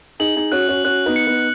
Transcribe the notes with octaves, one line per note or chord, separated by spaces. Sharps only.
D#4 G#4 F#7
D#4 G#4
C#4 F#4 F#6
C#4 F#4
C#4 F#4 F#6
B3 D#4
C#7
B3 D#4